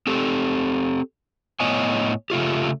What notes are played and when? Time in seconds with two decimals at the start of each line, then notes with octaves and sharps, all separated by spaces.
0.07 C4 G4 A4
1.60 A2 B3 C#5 D#5 G#5
2.30 C#3 A3 F4 G4